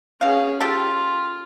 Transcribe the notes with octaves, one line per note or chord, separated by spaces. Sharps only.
B2 C#4 G#4 F5
F4 G4 A4 A5